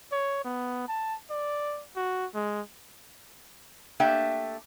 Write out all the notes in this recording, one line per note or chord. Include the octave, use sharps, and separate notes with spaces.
C#5
B3
A5
D5
F#4
G#3
A3 A#3 D4 G4 E5 G5